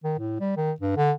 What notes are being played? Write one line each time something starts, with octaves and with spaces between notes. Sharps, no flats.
D#3
A2
G3
D#3
G2
D3